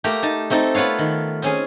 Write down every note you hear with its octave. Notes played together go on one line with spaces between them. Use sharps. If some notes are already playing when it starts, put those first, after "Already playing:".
A3 A#3 G4 A#5
D#4 A5
A3 C4 D#4 A4
B3 F4 B4 C#5 F5
D#3
C4 C#4 G#4